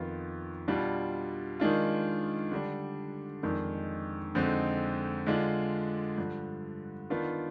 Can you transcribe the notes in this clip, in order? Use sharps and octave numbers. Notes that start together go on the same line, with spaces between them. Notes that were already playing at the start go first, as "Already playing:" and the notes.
Already playing: F2 D#3 B3 F4
B2 G3 D4 F4
D#3 G#3 D4 F4
D3 G3 D4
F2 D#3 G#3 D4
F2 D3 G#3 C4 D#4
D3 G#3 D4 F4
G2 D3 F3
D#3 B3 D4 F4